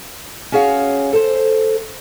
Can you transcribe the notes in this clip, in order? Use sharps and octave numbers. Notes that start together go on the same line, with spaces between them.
C#4 F#4 G#4 C#5 F5
A4 C5